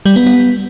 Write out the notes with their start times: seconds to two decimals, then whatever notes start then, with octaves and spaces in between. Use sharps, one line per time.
0.05 G3
0.16 B3
0.27 B3